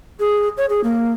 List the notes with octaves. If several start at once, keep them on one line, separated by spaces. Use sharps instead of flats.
G#4
C#5
G#4
A#3